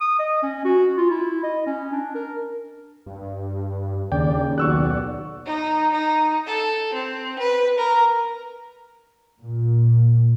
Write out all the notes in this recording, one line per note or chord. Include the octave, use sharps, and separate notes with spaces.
D#6
D#5
C#4
F#4
F4
E4
D#5
C#4
D4
A#4
G2
D#2 C#3 D4 D5 G5
B1 F#4 D5 C#6 E6 F#6
D#4
D#4
A4
C4
B4
A#4
A#2